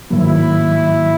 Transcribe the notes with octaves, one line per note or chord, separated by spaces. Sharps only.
G#2 D#3 F#3 A#3 E4